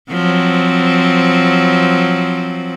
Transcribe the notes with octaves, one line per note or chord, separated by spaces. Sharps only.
F3 F#3 C4